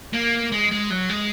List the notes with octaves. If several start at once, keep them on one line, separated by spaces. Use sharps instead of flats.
A#3
G#3
G#3
F#3
G#3